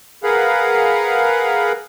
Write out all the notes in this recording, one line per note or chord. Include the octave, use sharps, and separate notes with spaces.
G#4 A#4 B4 F5 F#5